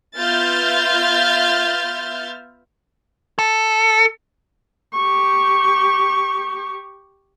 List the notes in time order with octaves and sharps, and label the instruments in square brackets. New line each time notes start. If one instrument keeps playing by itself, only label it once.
[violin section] B3 F4 E5 F6 G6 A6
[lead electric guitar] A4
[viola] G4 C#6